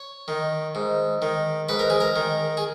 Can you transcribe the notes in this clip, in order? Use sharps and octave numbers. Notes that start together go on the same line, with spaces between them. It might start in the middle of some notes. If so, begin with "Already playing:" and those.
Already playing: C#5
D#3
G#2
D#3
G#2 B4
A#4
G#4
A#4
D#3
G#4